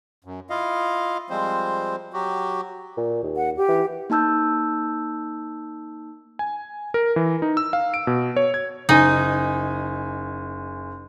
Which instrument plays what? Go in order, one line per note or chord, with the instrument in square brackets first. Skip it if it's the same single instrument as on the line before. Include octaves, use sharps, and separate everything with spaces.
[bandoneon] F#2
E4 F4 D#5 F5
F3 G3 G#3 C4 C5
F#3 F#4 G4
[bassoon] A#2
D#2
[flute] F#5
G4
[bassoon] E3
[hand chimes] A#3 D#4 A5 E6 G6
[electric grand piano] G#5
A#4
E3
D#4
E6
F5
D7
B2
C#5
G#6
[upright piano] F#1 G#5 [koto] D#4